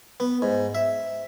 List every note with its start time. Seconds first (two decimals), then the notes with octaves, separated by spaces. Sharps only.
0.20 B3
0.42 G#2
0.75 E5